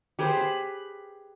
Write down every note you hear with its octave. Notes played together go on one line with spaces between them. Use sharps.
G4 G#4 B4 C5
B5